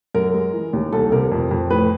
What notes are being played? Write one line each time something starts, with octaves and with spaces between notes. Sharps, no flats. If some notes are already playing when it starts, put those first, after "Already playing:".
F#2 A#4
G#3
E3
D#2
C2 A4
C3 A#4
F2
F2
A2 B4